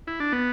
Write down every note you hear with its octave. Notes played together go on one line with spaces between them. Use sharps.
E4
D4
B3